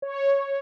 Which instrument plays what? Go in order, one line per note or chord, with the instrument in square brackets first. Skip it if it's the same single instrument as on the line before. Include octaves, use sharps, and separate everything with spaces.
[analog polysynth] C#5